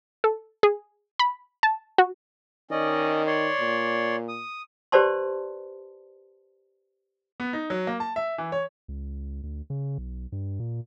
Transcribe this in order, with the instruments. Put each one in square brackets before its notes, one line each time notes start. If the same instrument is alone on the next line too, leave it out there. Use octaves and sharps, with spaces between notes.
[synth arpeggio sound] A4
G#4
B5
A5
F#4
[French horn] D#3 [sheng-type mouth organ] C#4 D5 D#5
[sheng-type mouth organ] C#5 D5 C6
[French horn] A#2
[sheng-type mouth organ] D#6
[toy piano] G4 B4 C5 D5 A5 C6
[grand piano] B3
D#4
F#3
A#3
A5
E5
E3
C#5
[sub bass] C#2
D2
C#3
B1
G2
A#2